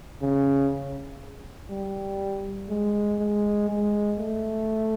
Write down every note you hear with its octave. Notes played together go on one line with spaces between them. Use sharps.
C#3
G3
G#3
G#3
G#3
A3